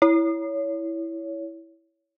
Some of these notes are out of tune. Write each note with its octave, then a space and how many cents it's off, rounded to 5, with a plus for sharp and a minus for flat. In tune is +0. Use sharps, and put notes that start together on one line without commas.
E4 +0 C#5 +20